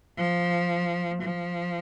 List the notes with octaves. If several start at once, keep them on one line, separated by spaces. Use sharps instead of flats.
F3
F3